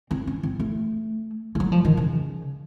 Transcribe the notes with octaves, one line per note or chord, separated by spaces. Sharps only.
C4
C#4
C4
A3
A3
F#3
F3
D#3
C#3